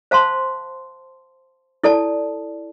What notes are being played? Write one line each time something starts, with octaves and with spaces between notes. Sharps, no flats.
C5 F5 A5 C6
E4 A4 D5 A5